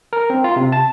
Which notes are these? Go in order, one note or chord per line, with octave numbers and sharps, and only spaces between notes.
A#4
C4
F4
C3
A5